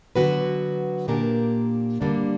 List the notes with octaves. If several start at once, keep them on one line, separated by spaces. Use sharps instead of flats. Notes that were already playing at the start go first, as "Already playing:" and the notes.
D3 F#3 B3 F#4 B4
A#2 A#3 D4 G4 A#4
G2 D3 G3 A#3 D4